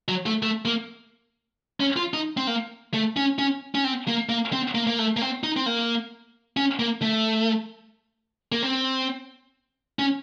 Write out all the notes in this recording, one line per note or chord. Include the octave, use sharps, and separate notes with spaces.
F#3
A3
A3
A#3
C#4
F4
D#4
C4
A#3
A3
C#4
C#4
C#4
C4
A#3
A#3
C4
A#3
A#3
A3
A#3
C4
D#4
C4
A#3
C#4
A#3
A3
A#3
C4
C#4